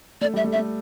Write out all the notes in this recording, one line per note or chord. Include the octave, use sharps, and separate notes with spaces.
A3 D5
G3 E5
A3
E5
A3